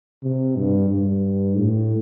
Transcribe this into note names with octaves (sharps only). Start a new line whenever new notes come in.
C3
G2
G2
A2